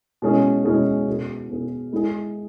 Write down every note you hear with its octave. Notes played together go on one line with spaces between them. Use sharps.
B2 G#3 C#4 E4 G#4
B2 G#3 C#4 E4 G#4
B2 B3 G#4
B2 B3 G#4
G#3 E4 G#4